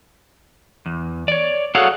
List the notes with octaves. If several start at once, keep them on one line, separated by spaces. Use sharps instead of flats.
E2
C#5 D5
F#4 G#4 A4 C#5 F5 F#5